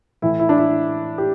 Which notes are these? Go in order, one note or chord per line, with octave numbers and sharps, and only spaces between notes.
A2 E3 E4
E4
D4
E4
G4